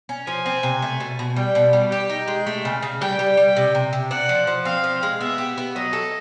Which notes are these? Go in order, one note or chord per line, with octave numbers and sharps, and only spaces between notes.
C#4
F3 G#5
C4
C3
A3
B2
B2
G3 G5
B2
G3
G4 G5
D#4
G#3
A3
C#3
C#3
G3 G5
G3
G3
C3
C3
C3
D4 F#5
F3
F3
C4 F5
F3
G#3
B3 E5
G4
B3
F#3 D#5
A4